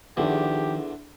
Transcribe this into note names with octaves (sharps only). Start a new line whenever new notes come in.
E2 D3 D#3 F3 D4 E4 G4 G#4